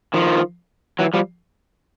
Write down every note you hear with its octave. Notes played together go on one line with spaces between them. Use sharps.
D#3 F3
E3 F#3
F3 G3